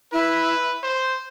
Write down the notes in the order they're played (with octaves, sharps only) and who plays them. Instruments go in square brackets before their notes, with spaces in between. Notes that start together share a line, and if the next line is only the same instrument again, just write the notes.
[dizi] E4 [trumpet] B4
[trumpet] C5